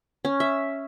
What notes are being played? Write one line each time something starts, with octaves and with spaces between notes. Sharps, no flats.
C#4
E5